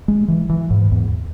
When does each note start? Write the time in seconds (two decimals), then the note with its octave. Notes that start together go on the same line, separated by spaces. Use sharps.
0.08 G#3
0.28 E3
0.50 E3
0.71 G#2
0.91 E2